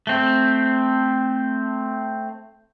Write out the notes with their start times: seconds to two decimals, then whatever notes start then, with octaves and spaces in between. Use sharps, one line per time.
0.07 A3 C4